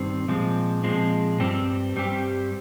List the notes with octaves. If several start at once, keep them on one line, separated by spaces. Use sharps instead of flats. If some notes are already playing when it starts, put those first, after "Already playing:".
Already playing: G2 D#3 G3 C4
A#2 F3 G#3 C4
A#2 F3 G#3 C4
G2 G3 C4 G4
G2 G3 C4 G4